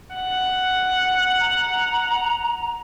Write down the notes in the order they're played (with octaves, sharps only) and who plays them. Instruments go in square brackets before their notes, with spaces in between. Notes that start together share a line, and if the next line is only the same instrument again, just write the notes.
[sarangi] F#5
[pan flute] A#5